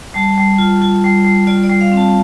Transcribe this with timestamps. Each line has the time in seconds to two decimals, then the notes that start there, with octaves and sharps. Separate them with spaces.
0.14 G3 A5
0.38 G3
0.58 F4
0.82 F4
1.04 G3
1.25 G3
1.47 F4 D5
1.64 D5
1.69 G3
1.81 F5
1.92 C4
1.97 A5